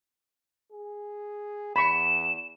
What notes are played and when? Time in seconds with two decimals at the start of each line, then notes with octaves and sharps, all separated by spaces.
0.72 G#4
1.76 E2 B5 C#6 E7